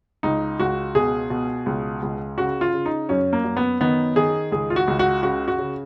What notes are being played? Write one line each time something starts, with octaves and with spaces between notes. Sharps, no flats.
C#2 D#4
C#2 F#4
B2 G#4
B2
C#2
C#2
C#3 F#4
F4
C#3
D#4
F#2 C#4
A#3
F#2
B3
D#3 B3
D#3 G#4
C#2 G#4
F4
F#4
C#2
F#4
C#3 F#4
F#4
C#3